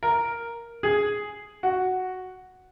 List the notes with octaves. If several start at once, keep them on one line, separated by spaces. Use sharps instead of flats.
A#4
G#4
F#4